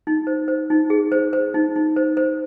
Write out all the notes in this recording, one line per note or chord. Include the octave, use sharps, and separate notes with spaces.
D#4
C5
C5
D#4
G#4
C5
C5
D#4
D#4
C5
C5